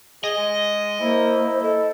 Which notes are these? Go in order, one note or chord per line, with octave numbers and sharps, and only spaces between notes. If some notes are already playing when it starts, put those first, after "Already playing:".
G#4 D#5
G#3
A#3 E4 C5
A4 D#5